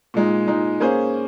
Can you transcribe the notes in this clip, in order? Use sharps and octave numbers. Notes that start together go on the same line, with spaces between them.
A#2 G#3 D#4
A#2 G#3 D#4
A#3 C#4 G#4 C5